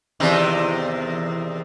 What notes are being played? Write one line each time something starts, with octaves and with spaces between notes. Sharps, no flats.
E2 C3 D#3